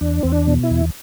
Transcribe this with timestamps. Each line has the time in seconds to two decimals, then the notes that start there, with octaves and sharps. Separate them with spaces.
0.01 E2 D4
0.23 E2 C4
0.32 D4
0.47 B2
0.63 E4
0.71 E2